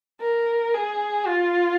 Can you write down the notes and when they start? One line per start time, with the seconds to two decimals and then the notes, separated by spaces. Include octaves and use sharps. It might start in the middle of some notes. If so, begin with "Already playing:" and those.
0.21 A#4
0.74 G#4
1.27 F4